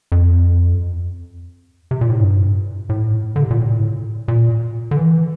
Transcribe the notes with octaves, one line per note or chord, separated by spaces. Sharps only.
F2
C3
A#2
A2
G2
A2
D3
C3
A#2
A2
A#2
D3
E3